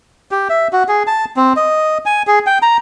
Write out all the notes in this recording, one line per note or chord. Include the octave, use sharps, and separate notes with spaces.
G4
E5
F#4
G#4
A5
C4
D#5
G#5
G#4
G5
A#5